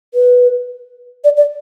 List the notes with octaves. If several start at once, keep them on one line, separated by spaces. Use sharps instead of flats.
B4
D5
D5